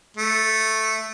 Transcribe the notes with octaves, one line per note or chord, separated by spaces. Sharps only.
A3